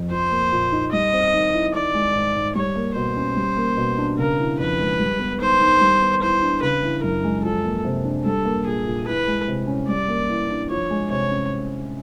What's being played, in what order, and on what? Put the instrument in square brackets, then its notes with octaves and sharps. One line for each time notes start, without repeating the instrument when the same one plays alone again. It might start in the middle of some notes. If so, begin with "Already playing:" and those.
Already playing: [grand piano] F2
[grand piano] F3 [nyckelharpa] C5
[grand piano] A#3
A#2
D#4
[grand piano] G3 [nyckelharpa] D#5
[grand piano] C4
D#3
E4
[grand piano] D#3 [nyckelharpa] D5
[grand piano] G#3
G#2
G#2
[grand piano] G3 [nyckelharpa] C#5
[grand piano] A#3
[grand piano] B2 [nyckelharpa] C5
[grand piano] C#4
G3
A#3
B2
D4
[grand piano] C#3 [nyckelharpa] A#4
[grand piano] E3
[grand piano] F2 [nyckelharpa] B4
[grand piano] G#3
G3
B3
[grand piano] D#3 [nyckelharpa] C5
[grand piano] D#3
G3
B3
[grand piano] E3 [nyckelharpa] C5
[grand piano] D4
[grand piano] C#3 [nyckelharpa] B4
[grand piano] E3
[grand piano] F#2 [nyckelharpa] A#4
[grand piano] G#3
[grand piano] F3 [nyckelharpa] A4
[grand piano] A#3
C3
D4
[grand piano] G3 [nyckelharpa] A4
[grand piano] A#3
[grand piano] A#2 [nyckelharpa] G#4
[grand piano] A#2
[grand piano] E3 [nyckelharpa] B4
[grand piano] G#3
C3
C#4
[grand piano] G3 [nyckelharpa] D5
[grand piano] A#3
E3
D4
[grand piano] F3 [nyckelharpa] C#5
[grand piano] G#3
[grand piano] C3 [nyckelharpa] C#5
[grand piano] C#4